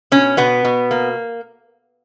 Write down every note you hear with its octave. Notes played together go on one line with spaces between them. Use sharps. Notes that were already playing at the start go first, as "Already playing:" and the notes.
B2 C#4
B2 B3
B2
A#3